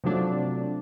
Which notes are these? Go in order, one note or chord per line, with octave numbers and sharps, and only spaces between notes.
C3 F3 F#3 A3 D4